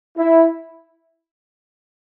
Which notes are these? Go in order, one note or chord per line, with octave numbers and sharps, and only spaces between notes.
E4